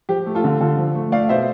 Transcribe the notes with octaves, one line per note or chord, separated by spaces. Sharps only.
F3 G4
A3
F4 A4
D3
D3 F4 A4
F3
A3
A3 D5 F5
B2 C5 E5